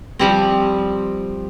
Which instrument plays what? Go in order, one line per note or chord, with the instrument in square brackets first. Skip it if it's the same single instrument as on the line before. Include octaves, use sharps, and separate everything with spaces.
[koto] F3 G3 C4